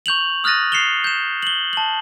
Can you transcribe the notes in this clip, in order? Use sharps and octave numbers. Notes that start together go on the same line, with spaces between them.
C#6 G6 F7 F#7
D#6 F6 F#6 A6 A#6 D#7
C7 C#7 E7 F7 G7
G6 E7
F#7 G7
A5 F#7